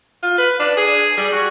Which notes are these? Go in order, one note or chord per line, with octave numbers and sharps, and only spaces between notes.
F4
B4
D4
G#4
G3
F#4